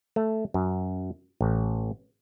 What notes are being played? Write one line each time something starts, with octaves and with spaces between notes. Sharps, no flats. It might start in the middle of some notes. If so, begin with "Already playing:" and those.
A3
F#2
A1